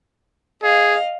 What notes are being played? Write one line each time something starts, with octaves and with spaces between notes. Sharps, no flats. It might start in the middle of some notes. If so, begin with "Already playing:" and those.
G#4 D#5 F5